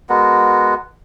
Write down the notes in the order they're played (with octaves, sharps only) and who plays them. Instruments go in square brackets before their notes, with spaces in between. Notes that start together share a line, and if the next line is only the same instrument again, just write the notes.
[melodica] G#3 B3 F#4 A#4